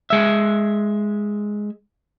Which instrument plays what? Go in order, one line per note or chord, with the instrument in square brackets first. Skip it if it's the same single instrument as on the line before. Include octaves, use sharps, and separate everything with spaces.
[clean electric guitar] G#3 E5